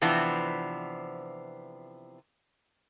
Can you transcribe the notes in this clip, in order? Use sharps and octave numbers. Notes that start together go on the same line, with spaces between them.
C3 E3 F3 B3 C4 D4